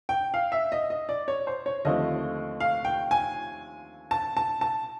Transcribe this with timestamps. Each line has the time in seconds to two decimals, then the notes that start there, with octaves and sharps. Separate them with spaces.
0.09 G5
0.34 F5
0.52 E5
0.72 D#5
0.90 D#5
1.09 D5
1.28 C#5
1.47 C5
1.66 C#5
1.85 D#2 D3 F3 A3 C4 D#5
2.60 F5
2.85 G5
3.11 G#5
4.11 A5
4.37 A5
4.61 A5